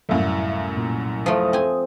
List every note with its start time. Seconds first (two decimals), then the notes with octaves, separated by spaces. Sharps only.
0.09 C2 F#2 A2 A3 E5 F5
0.77 A#2
1.26 F3 A3 D#6
1.53 C4 G#5